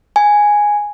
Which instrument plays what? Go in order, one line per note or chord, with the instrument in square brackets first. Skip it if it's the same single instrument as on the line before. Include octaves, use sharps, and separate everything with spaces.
[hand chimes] G#5